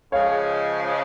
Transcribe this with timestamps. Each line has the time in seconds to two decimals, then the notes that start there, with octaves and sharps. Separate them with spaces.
0.12 C#3 F3 G#3 C#5 F5